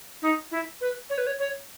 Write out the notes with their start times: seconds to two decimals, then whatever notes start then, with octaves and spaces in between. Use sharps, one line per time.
0.22 D#4
0.51 E4
0.80 B4
1.09 C#5
1.17 B4
1.26 C#5
1.39 C#5